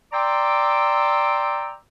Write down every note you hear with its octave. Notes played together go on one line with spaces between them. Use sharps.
D5 G5 A#5 C6 D6 E6